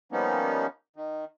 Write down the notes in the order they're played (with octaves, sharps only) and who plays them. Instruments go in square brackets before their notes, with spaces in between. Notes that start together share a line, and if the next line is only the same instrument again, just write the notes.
[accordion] F3 G3 A#3 B3 C#4 D#4
D#3